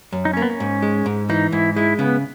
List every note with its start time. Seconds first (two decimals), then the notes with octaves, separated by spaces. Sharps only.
0.13 F#2
0.25 D#4
0.33 A#3 C#4
0.42 B3
0.50 C#4
0.60 G#2
0.82 G#3
1.06 G#2
1.30 E3 D#4
1.52 G#2 E4
1.76 G#3 E4
1.99 C#3 B3